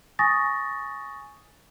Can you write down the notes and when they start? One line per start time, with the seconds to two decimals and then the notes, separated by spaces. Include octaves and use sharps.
0.19 G#5 C#6 D#6 A6 A#6